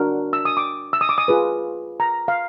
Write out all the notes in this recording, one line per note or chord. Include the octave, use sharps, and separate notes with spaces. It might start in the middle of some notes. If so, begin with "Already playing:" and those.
Already playing: D4 F#4 A#4
E6
D#6
D6
E6
D#6
D6
D#6
F4 G#4 B4
A#5
F5